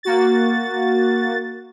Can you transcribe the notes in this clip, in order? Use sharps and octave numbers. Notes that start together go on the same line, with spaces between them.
A#3 F#4 A6